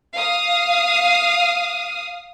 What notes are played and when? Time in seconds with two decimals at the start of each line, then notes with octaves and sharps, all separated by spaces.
0.15 F5 D#6